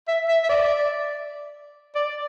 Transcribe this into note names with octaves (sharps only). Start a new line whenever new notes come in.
E5
E5
E5
D5
D5